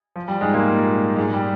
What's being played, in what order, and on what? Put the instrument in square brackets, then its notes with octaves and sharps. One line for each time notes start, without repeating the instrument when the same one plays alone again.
[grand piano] F3
G3
G#2 G#3
A#2 A#3
G#2 G#3
G3